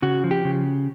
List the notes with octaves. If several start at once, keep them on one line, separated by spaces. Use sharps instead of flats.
C#3 F#4
F3
G4
C#3